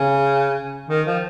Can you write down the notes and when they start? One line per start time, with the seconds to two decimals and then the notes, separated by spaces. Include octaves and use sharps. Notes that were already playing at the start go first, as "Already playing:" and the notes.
Already playing: C#3
0.89 D#3
1.06 F3